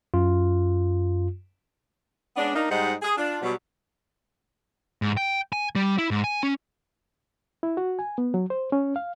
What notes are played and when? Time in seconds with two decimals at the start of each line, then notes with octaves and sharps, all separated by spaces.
0.14 F#2 F4
2.36 G#3 B3 C#4 D4
2.55 A#3 D4 D#4
2.70 G#2 G3 D#4 C5 D#5 F#5
3.02 G#4
3.17 D4 F4
3.42 B2 F#3 G3
5.02 G#2
5.17 G5
5.53 G#5
5.75 G3
5.98 E4
6.11 G#2
6.24 G#5
6.43 C#4
7.63 E4
7.77 F#4
7.99 G#5
8.18 B3
8.34 F#3
8.50 C5
8.72 C#4
8.96 F5